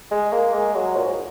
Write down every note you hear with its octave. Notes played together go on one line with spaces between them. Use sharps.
G#3
A#3
G#3
F#3
A#2
G#2